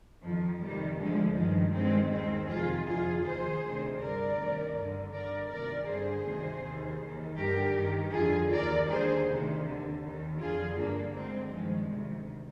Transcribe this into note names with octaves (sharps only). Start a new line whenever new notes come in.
F2 D#3 F3
F2 C3 D#3 G3
D2 D3 F3 G#3
G2 D#3 F3 G#3
G2 D#3 G#3 C4
D#2 D#3 G#3 C4
F2 C3 D#3 F4 G#4
F2 D3 F4 G#4
D#2 D#3 G#4 C5
D2 C3 D#3
G2 D3 A#4 D5
D2 C3 D#3
G2 D3
G2 D3 A#4 D5
D2 C3 D#3 A#4 D5
G2 D3 G#4 C5
D2 C3 D#3
D#2 D#3
D#2 D#3
G2 D3 G4 A#4
G2 D#3
F2 D3 F4 G#4
D#2 D#3 A#4 D5
D#2 D3 G#4 C5
D2 C3 D#3
D#2 D3
D#2 D#3
F2 D3 F4 G#4
G2 D3 A#3 D4
D2 D3 G#3 C4
G2 D#3 F3 G#3
D2 C3 D#3